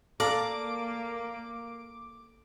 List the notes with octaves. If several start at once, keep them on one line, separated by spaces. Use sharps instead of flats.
A#3 A4 D5 F5 A#5 D6